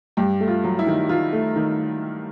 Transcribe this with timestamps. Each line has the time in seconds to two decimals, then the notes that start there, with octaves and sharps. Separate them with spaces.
0.17 G2 G4
0.40 A3
0.48 F4
0.64 F#3
0.79 E4
0.87 D#3
1.09 D#3 F4
1.33 A3
1.56 D#3